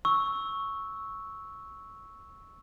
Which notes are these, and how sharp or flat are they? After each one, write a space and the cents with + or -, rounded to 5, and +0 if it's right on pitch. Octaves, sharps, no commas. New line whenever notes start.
C#6 +0 E6 -10